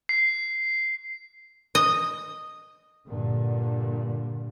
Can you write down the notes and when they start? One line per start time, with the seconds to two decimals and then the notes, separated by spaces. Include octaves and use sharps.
0.09 C7
1.75 D#5
3.07 G2 A#2 D3